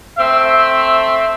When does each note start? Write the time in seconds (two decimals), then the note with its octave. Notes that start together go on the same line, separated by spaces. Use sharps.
0.19 A3 C4 E5